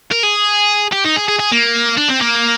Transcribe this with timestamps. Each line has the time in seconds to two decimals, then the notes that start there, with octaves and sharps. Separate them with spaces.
0.11 A#4
0.23 G#4
0.93 G4
1.05 D#4
1.16 G#4
1.28 G#4
1.39 G#4
1.52 A#3
1.98 D4
2.10 C4
2.22 A#3